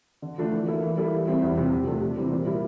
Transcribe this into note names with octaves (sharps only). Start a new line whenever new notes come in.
D3
F3 A3 D4
E3
A#3 E4 A4
E3
G3 A#3 E4 A4
E3
G3 C4 E4
E2
C3 F3 C4 F4
C3
F3 A3 D4 A4
C3
E3 G3 C4
A#2
G3 A#3 E4